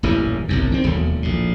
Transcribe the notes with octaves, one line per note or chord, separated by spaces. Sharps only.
D#1 A1 F#2 E3
G1 C2 F#2
D#3 C4
E1 D#2 D3 F#3
A#1 A2